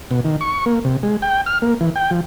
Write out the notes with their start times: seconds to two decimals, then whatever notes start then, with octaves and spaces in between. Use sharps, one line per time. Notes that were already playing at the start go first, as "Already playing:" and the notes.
0.11 B2
0.25 D#3
0.41 C#6
0.66 A#3
0.85 C3
1.03 G#3
1.22 G5
1.46 F6
1.62 A#3
1.81 E3
1.96 G5
2.11 F3